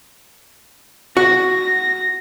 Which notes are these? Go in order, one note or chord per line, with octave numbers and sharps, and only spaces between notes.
F#4 A#6